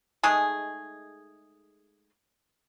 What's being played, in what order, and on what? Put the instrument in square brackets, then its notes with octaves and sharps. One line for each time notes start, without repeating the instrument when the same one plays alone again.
[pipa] G#3 A3 D#4 G#4